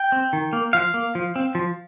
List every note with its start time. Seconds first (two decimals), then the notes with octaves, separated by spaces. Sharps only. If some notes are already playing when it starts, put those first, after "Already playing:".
Already playing: G5
0.12 C4
0.33 D#3
0.53 A#3
0.73 F3 F5
0.94 A#3
1.15 F3
1.36 C4
1.55 F3